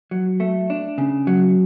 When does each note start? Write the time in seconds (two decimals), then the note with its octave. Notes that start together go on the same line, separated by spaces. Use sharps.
0.11 F#3
0.40 A3
0.70 D4
0.98 C#3
1.27 F#3